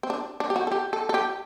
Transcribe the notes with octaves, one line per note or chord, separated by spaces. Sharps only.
C4
D4
D4
G4
F#4
A4
G4
A4
A4
G4